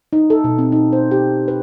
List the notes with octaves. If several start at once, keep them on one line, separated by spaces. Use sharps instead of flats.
D#4
A4
B2
C4
D#4
C5
G4
B4